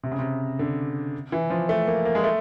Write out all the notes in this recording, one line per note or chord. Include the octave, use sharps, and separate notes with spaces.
C3
C#3
C3
D3
E3
F3
A3
A#3
A#3
G#3
A3